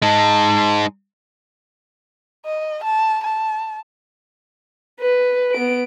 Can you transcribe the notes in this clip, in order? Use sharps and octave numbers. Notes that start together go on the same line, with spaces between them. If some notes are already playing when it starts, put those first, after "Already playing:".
G#3 D#4 A5
D#5
A5
A5
B4
B3 D7